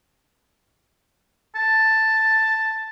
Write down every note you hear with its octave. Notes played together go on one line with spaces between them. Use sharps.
A5